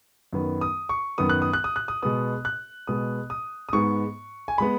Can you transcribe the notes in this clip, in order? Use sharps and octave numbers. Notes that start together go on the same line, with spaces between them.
F#2 D#3 B3
D#6
C#6
F#2 D#3 B3 D#6
F#6
D#6
F#6
D#6
F#6
D#6
B2 G#3 B3 D#6
F#6
B2 G#3 B3 D#6
D#6
D#6
G#2 G#3 B3 C#6
G#5
G#3 B3 B5